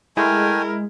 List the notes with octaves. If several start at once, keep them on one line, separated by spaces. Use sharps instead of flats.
G#3 A3 E4 A#4 G5 G#5